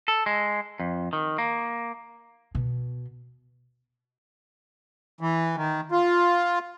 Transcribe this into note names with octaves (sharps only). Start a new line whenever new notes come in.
A4
G#3
F2
D#3
A#3
B2
E3
D#3
F4